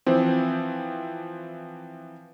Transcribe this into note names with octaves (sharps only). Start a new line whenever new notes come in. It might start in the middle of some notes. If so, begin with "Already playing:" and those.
E3 F3 C4